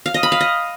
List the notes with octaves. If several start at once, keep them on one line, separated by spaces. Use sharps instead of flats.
F5
D#5
B5
F5
D#5